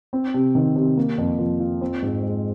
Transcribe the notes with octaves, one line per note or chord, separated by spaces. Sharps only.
C4
C3
D#3
C3
A#3
F2
F3
F4
C4
G#2
G#3